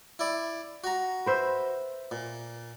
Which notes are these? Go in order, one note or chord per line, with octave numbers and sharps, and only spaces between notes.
E4 D5
F#4 A#5
B4 C5 E5
A#2